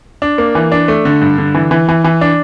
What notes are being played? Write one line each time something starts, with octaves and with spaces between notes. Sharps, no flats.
D4
A#3
E3
D4
A3
D3
G2
D3
E3
E3
E3
E3
D4